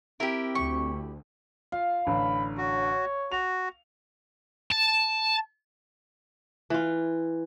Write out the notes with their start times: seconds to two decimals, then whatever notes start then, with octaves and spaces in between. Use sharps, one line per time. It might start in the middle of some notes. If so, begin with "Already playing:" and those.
0.20 C4 E4 G4 A#4
0.55 D2 C#6
1.72 F4 F5
2.07 A1 D3 B5
2.57 F#4 C#5
3.32 F#4 F7
4.71 A5
6.70 E3 F4